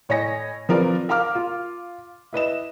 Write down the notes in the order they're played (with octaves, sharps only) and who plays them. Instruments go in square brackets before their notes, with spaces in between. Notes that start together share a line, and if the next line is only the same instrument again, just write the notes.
[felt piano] A2 C#5 D#5 G#5 A#6 C#7
F3 C4 A#4 B4 D5
A#4 F5 A#5 D6 F6
F4
E4 B4 D#5 E7